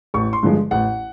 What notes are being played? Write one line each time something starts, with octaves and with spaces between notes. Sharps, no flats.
A1 C#6
C6
G2 D3 F3 G#3
A1 F#5